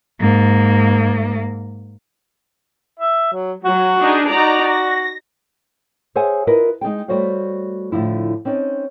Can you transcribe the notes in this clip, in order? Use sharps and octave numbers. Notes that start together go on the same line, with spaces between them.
G#2 A#3
E5
F#3
F#3 F#4
D4 D#4 G#4
D#4 F#4 D5 A#5
A#6
G#4 C5 C#5 E5 F#5 G#5
E4 F4 A#4 B4 D#5
G#3 D#4 G#4 G5
G3 A3 F#4 C5 C#5 F5
A2 D3 F3 E4
C4 C#4 D#4 D5